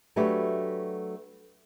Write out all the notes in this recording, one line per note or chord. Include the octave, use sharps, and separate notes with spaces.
F#3 A3 D4 F#4 G4 B4